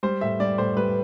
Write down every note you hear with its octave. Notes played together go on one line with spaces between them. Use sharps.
G3 C5
A2 E5
G3 D5
A2 C5
G3 B4